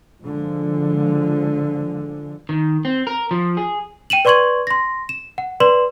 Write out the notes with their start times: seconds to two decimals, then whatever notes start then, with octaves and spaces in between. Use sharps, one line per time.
0.22 D3 F3 G#3
2.49 D#3
2.85 C4
3.07 A#4
3.31 F3
3.57 G#4
4.10 G5 D#7 E7 F#7
4.25 B4 D5 C6 C#6 G#6 F#7
4.67 C6 A#6
5.09 E7
5.38 F#5
5.60 B4 D5 C6 E7 F#7